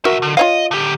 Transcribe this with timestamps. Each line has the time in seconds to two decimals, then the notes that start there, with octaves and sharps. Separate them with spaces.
0.05 B1 F#4 A#4 E5
0.22 D3
0.37 F4 C#5 D#5 F5
0.71 D3 G4